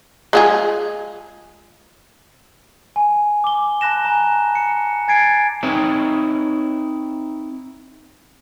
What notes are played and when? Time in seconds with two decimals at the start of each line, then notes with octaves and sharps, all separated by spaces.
0.33 G#3 F4 G#4
2.96 G#5
3.44 D6 G7
3.81 A5 B5 F#6 A#6 E7
4.05 G#5 A#5
4.55 C#7
5.08 G#5 G#6 A6 C7 D7
5.63 C4 D#4 E4 B4 C#5 E5